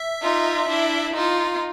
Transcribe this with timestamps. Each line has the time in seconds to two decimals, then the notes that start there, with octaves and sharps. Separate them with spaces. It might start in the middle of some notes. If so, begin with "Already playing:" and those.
Already playing: E5
0.22 D#4 F4
0.69 D4 E4
1.15 D#4 F4